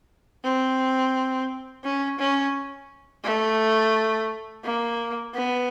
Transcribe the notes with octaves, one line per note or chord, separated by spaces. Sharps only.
C4
C#4
C#4
A3
A#3
B3